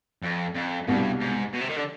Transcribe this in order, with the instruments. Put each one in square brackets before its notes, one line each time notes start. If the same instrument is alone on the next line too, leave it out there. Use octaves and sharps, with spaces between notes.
[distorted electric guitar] F2
F2
[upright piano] C2 B2 G3 [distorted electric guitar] G2
[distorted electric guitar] G#2
B2
C3
D#3
D3